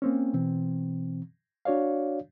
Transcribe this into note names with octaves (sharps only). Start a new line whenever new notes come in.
A#3 C4 C#4
B2 E3 C4
D4 F#4 C#5 D5 F5